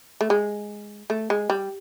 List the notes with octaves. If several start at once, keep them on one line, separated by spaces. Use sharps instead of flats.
A3
G#3
A3
G#3
G3